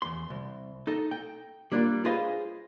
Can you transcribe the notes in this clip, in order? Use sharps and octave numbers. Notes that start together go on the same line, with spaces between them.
E2 C6
C2
D#4 A4 D#5
G5
G3 A#3 D4 D#4 F4
F4 G#4 B4 C5 D#5 F5